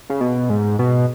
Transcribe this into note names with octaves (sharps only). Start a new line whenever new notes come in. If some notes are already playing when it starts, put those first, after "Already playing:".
C#3
B2
G#2
B2